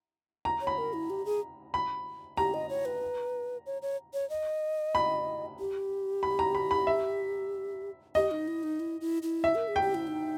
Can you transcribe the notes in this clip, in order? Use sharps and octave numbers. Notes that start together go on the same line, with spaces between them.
A#5
C#5
B5
A#4
E4
G4
G#4
B5
G4 A#5
D#5
C#5
B4
C#5
C#5
C#5
D#5
B5
G4
B5
A#5
B5
B5
E5
G4 D#5
D#4
E4
D#4
E4
E4
E4
E5
A#4
G#4
G5
G4
E4
D#4